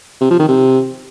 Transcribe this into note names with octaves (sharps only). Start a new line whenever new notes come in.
C3
F3
D#3
C3